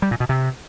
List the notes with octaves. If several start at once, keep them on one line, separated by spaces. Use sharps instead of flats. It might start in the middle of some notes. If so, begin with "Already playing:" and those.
G3
A#2
B2
C3